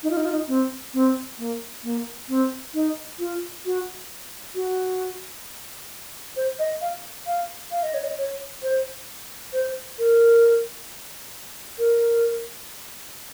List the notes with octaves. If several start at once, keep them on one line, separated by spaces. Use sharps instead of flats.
D#4
F4
D#4
F4
D#4
C4
C4
A#3
A#3
C4
D#4
F4
F#4
F#4
C5
D#5
F5
F5
F5
D#5
C#5
D#5
C#5
C5
C5
A#4
A#4